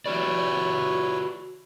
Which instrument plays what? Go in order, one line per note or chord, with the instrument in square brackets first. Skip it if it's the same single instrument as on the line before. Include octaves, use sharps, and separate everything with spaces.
[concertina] E4 B4 C#5 [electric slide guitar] F#4 G4 D5